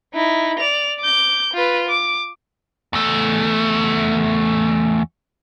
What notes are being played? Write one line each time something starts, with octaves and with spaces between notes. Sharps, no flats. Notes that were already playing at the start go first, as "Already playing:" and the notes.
D#4 E4
D5 F7
D6 G6
F4 B4
D6
E2 A3